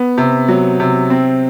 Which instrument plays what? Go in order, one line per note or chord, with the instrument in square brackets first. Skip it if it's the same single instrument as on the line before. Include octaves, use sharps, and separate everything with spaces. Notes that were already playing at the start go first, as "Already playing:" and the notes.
Already playing: [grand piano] B3
C3
F#3
C3
C4